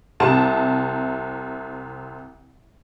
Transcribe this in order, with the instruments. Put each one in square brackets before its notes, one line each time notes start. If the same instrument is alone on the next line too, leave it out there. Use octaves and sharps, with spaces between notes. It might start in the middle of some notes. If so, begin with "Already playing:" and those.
[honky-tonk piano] C2 C3 A5 E7